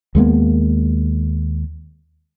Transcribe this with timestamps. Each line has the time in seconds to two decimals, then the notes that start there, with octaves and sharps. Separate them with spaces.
0.15 D#2 G#3 A#3 B3